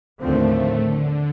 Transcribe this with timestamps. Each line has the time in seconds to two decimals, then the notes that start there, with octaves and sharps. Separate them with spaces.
0.21 D#2 A2 D3 F3 A3 C4
0.81 D3